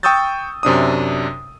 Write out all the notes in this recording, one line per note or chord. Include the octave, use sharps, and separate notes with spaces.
G5 C#6 D#6 E6 G6 A6
F#2 C3 D4 D#6